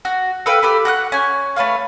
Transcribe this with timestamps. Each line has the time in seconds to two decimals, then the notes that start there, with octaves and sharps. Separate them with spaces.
0.05 F#4
0.46 A4 B4 F5 G5
0.63 G4 A4 B4
0.85 F#4 F#5 F#6
1.12 C#4 G#5
1.56 A3 B4 C#5 F5